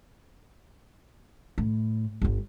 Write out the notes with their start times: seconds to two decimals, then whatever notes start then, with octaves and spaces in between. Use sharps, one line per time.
1.58 A2
2.22 G1 G2